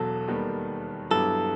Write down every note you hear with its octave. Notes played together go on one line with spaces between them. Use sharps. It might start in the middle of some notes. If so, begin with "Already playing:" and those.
Already playing: E1 E2 B2 F#3 A4
D#2 D#3 G3 B3
G2 F#3 B3 E4 G4 A4